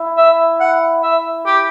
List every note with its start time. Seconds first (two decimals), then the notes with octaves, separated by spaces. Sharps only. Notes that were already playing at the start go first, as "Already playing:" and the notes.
Already playing: E4
0.17 E5
0.60 F#5
1.03 E5
1.46 G4